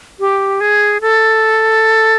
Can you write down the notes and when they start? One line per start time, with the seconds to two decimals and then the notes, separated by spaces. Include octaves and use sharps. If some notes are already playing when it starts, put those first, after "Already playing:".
0.20 G4
0.61 G#4
1.01 A4